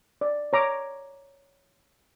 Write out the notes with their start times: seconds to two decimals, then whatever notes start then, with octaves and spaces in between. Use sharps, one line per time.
0.21 D5
0.53 C#5 A#5 D6